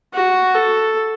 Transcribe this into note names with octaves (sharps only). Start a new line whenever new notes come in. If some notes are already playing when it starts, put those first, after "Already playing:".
F#4
A4